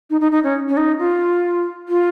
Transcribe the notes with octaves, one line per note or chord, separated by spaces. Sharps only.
D#4
D#4
D#4
C#4
C#4
D#4
F4
F4